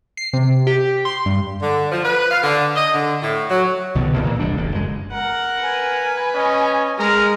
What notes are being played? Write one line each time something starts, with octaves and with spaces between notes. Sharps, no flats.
C7
C3
G4
C6
G2
D3
F3
B4
F5
D3
D#5
D3
A2
F#3
C2 B2 D3 D#3
C2 B2 A#3
A#2 E3 F3 A#3
F1 E2 G3 D4
D1 A1
F#1 G#3
A#4 F#5
B4 G#5
C#4 D#5
G#3 A#4 A#5 F6